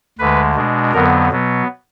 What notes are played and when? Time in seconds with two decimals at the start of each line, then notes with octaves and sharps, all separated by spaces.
0.19 D2 D3 G#3 B4
0.55 B2 G#3 D4
0.93 F2 D3 F#3 B3 A#4
1.31 B2 F#3 B3